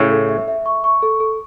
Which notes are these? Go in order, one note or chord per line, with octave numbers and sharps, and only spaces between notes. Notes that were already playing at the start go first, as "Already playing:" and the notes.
Already playing: A2 C#3 C#6
A4
E5
E5
C#6
C#6
A4
A4